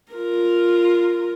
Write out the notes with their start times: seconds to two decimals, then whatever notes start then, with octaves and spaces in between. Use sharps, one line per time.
0.13 F4 A#4